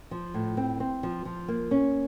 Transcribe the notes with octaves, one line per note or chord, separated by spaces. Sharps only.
F3
A2
C4
C4
F3
F3
A#3
C#4